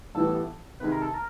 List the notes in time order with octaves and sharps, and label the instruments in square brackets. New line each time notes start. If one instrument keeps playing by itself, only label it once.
[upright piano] A1 A2 E3 G3 B3 [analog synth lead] A4
[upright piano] C3 D#3 G#3 [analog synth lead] B4
[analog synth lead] A#4
A4
A#4